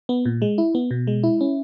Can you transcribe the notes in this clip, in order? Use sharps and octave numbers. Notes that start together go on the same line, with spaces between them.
B3
A#2
G#3
E4
B3
B2
G#3
E4
C#4